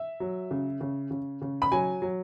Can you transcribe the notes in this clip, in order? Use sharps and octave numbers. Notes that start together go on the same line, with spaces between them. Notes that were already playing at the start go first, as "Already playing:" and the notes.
Already playing: E5
F#3
C#3
C#3
C#3
C#3
B5
F#3 G#5
F#3